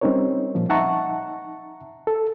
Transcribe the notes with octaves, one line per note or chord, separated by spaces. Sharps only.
G3 C4 C#4 D#4 A#4 C#5
A#2 F3
D#4 E5 F#5 A5 A#5 C#6
A4